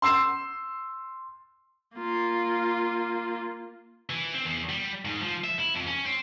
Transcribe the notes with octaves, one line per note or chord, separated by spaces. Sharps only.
C6 E6 C7 E7
A#3 F4
E3
C4
E2
G3
G#2
F3
E5
E4
F2
C#4
C4